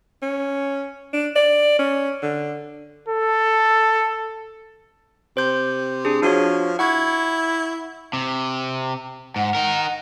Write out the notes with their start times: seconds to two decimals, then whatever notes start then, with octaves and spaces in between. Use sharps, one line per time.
0.22 C#4
1.13 D4
1.36 D5
1.79 C#4
2.22 D3
3.08 A4
5.37 C3 C5 G6
6.05 D4 G#4
6.22 F3 D4 F#4 C#5
6.79 E4 F#5 C#6 G#6
8.13 C3
9.36 G#2 F#5
9.55 D#4 A#4